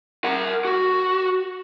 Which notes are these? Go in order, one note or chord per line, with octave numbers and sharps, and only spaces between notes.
A#4 F#5
F#4